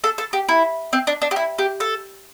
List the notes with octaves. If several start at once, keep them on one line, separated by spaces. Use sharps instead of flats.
A4
A4
G4
E4
C4
D4
D4
G4
E4
G4
A4